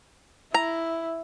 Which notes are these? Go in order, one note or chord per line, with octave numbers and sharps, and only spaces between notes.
E4 A#5